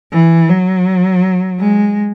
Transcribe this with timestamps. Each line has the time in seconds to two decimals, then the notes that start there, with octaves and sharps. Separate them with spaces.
0.12 E3
0.49 F#3
1.60 G#3